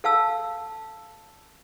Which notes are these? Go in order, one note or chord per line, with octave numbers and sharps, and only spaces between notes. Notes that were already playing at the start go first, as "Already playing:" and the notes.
A4 F5 A5 E6